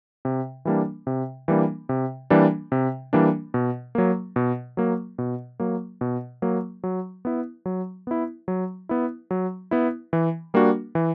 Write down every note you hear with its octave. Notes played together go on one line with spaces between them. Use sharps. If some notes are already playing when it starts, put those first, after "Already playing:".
C3
E3 G3 A#3 D4
C3
E3 G3 A#3 D4
C3
E3 G3 A#3 D4
C3
E3 G3 A#3 D4
B2
F#3 A#3
B2
F#3 A#3
B2
F#3 A#3
B2
F#3 A#3
F#3
B3 E4
F#3
B3 E4
F#3
B3 E4
F#3
B3 E4
E3
G3 A#3 D4 F#4
E3